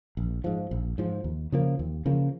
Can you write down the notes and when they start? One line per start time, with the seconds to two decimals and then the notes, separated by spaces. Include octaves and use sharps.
0.17 A#1
0.44 G#2 F3
0.71 A#1
0.98 G#2 F3
1.24 D#2
1.52 C#3 F3 A#3
1.79 D#2
2.06 C#3 F3 A#3